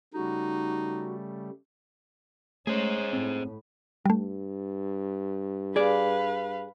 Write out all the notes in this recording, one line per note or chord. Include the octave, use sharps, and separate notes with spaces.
C#3 G3 A3 D#4 F#4
G#3 A3 C#4 G#4 C5
A2 C4
G2 G3 A3
G#4 B4 D5 F5